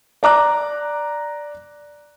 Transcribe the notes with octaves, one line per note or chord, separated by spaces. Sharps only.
D5 A#5 D6 F#6